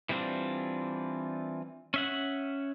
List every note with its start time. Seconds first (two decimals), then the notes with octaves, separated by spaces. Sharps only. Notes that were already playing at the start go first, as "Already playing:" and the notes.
0.09 E3 G3 C4 D4 F4
1.94 C#4 E5 F#5